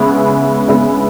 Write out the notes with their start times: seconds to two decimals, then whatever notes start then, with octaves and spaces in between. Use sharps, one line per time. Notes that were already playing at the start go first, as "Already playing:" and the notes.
Already playing: C#3 G#3 B3 E4
0.68 C#3 G#3 B3 E4